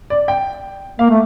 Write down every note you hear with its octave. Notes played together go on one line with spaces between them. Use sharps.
D5
G5
A#3 F5
A3